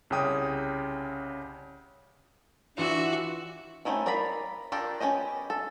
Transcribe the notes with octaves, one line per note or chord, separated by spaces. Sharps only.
C2 C#3 C#4 G5 D#6
E3 D4 F4 F#4 E5
A3 C4 C#4 D#4 E4
A#4 D5 F5 A#5 B5
D4 F4 G4 A4 A#4
B3 C#4 G4 C5 D#5
A4